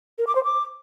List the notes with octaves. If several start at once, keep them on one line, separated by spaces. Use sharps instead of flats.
A#4
D6
C5
D6